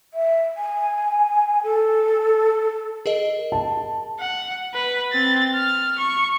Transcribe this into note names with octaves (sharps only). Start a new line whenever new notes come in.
E5
G#5
A4
G#4 A#4 D#5
A5
F#5
B4
C4 A6
F6
C#6